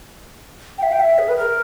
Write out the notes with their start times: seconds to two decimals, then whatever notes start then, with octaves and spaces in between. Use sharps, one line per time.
0.78 G5
0.83 E5
0.92 G5
1.00 E5
1.19 G#4
1.28 B4
1.37 A#4